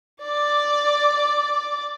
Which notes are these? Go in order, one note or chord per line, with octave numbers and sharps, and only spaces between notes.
D5 D6